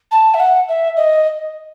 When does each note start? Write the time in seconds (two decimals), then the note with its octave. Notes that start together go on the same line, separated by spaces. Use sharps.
0.11 A5
0.34 E5
0.40 F#5
0.69 E5
0.97 D#5